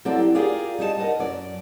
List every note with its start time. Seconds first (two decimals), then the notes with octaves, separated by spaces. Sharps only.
0.05 F#3 C4 E4 A4 D5
0.18 G4
0.35 F4 G4 G#4 A#4 D5 F5
0.79 G3 D#4 E4 A5
0.97 A#4 B4 D#5 F#5 A5
1.19 F#2 D5